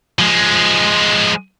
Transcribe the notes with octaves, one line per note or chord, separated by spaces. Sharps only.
F3 G#3